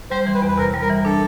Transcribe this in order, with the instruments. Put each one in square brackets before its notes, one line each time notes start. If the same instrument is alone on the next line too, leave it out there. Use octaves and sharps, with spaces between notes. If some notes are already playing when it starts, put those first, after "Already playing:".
[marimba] G3 [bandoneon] C5
[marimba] E3
[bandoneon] B4
[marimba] E2
[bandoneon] B4
[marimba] C3 [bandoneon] A#4
[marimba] G3
[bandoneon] A#4
[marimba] E3
[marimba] D4 [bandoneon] A4